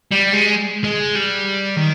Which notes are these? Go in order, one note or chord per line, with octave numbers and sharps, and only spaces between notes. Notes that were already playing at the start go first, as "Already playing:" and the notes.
G3
G#3
G#3
G3
D#3